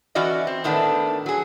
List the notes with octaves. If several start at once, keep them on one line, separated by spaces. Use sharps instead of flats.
E3 C#4 F#4 D5 D#5
C4
A2 D#3 A3 B3 D4
F#3 G#4